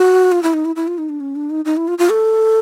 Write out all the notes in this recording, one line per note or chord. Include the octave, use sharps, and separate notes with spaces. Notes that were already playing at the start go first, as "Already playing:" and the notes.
Already playing: F#4
F4
E4
D#4
E4
E4
F4
D#4
D4
C#4
D4
D#4
D#4
E4
F4
F4
A4